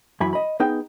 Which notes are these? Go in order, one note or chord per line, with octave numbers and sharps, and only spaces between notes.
F#2 E3 G#5 B5
D#5 B5
B3 D#4 G#4 G5